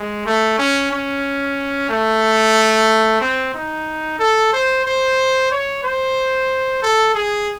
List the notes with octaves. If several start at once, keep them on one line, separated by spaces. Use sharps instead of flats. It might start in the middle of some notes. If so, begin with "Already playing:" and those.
Already playing: G#3
A3
C#4
C#4
A3
C4
D#4
A4
C5
C5
C#5
C5
A4
G#4